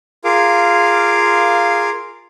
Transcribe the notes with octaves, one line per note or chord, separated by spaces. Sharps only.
F4 G#4 A#4 F5 D6